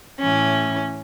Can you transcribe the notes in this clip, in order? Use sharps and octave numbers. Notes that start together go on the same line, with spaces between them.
A2 E3 C#4